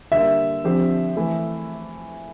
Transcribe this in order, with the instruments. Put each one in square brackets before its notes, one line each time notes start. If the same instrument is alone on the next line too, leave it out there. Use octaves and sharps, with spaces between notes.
[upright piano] D3 G3 A#3 [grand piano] E5
[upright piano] D3 F3 C4 G4 C5
E3 A3